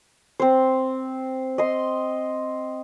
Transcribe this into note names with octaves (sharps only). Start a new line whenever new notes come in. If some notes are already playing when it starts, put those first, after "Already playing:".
C4 C5
D#5 C6